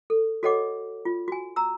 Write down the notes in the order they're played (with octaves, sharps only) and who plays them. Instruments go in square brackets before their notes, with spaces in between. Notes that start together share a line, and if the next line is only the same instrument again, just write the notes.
[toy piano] A4
F#4 A4 C#5 D#5 F#5 D6
F4
F#4 G#5
A#5 E6